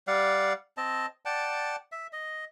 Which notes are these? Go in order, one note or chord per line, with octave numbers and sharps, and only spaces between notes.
G3 D5 F5 F#5
C4 D#5 A5
D5 F#5 G5 A5
E5
D#5